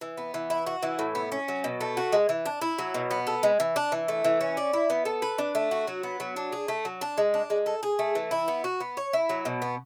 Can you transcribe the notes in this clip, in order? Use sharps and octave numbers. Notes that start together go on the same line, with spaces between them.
E3
B3
E3
E4
F#4
E3
A2
B3
C#4
F#3
B2
A3
F#4
G#3
E3
D4
E4
F#3
B2
B3
A4
G#3
E3
D4
E3
A3
E3
C#4
D5
E4
B3
A4
B4
D4
A3
F#4
F#3
B3
F#3
D4
G#4
A3
F#3
D4
G#3
D4
G#3
A4
G#4
A3
E3
E4
B3
F#4
B3
C#5
E4
F#3
B2
B3